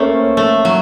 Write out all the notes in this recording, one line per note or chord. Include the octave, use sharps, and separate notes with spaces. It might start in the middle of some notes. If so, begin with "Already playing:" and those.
Already playing: A3 A#3 C#4 A4 C5
A3
F#3